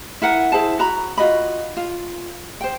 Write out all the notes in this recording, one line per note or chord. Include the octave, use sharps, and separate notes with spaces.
E4 A#4 F#5 G#5
E4 G#4 C5 A5
F#4 A#5 B5
F4 F#4 D#5 B5
F4
C5 G5